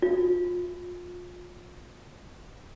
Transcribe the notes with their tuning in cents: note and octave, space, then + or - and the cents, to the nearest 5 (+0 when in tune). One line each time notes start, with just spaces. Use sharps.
F4 +30